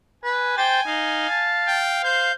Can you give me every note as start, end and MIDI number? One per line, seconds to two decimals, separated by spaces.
0.24 0.53 71
0.24 1.53 80
0.57 0.80 72
0.57 0.81 79
0.57 0.80 93
0.87 1.25 63
0.87 2.32 77
1.29 1.77 81
1.68 2.03 79
2.04 2.31 72
2.04 2.34 91